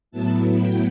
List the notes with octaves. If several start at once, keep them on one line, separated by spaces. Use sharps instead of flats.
A2 F#3 B3 E4 A5
G5